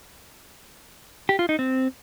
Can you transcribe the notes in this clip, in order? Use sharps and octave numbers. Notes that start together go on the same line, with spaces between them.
G4
F4
D#4
C4